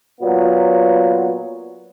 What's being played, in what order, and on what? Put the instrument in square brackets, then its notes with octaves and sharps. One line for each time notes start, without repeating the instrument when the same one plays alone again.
[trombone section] A#2 F#3 B3 F4